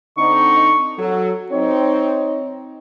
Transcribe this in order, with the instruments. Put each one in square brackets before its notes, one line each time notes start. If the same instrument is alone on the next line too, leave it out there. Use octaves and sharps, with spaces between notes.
[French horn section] D3 C4 D#4 [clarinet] C#6
[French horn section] F#3 [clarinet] A4
[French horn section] C4 D#4 [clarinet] C#5